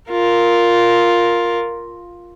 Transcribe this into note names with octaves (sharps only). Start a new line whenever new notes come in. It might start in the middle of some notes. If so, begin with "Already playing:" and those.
F4 A#4